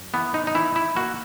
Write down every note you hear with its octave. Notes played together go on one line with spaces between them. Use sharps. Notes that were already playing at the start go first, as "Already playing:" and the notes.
Already playing: F#2
E3 B3
D#4
D#4
E3 E4
E4
A#3 F#4